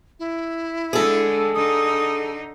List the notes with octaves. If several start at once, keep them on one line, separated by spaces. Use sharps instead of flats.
E4
D3 G#3 G#4 A4
D3 D#4 D#6